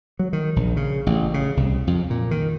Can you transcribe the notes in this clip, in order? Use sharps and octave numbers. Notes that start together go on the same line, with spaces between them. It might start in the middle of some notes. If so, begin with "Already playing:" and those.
F#3
D#3
A#1
C#3
A1
C#3
C2
F2
A#2
D#3